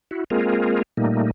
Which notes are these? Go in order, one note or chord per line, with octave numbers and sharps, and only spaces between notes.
E4 F#4
G#3 A#3 C4 F4 G#4 A#4
A#2 G3 A3 A#3 D#4